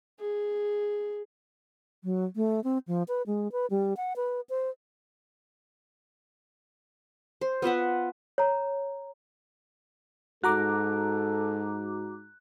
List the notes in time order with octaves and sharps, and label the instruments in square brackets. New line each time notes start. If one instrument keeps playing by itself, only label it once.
[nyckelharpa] G#4
[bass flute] F#3
A3
C4
F3
B4
G#3
B4
G3
F#5
B4
C5
[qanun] C5
B3 F4 E5 F#5
[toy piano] C#5 A#5
[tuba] G#2 [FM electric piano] F#4 A#5 D6 [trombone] A4 [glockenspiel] F#6